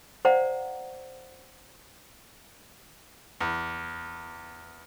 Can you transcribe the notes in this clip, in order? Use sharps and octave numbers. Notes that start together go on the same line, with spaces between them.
C5 D5 F5 F#5 A#5
E2